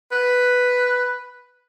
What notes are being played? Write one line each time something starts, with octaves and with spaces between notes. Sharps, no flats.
B4